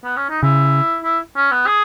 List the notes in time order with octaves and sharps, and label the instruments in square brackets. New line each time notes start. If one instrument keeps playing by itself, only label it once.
[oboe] B3
C#4
D#4
[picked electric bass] C#3 [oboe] E4
[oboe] E4
C#4
B3
G#4